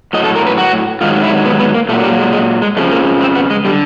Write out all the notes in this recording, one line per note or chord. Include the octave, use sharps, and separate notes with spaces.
A2 F#3 D#5
A4
A#4
B4
F#4
G#2 D#3 F#3 F4
E4
B3
B3
A#3
A#2 F#3 A3
G3
G#3
G#3
G#3
F2 C#3 F3 A3
A#3
C4
B3
G#3
D3 G3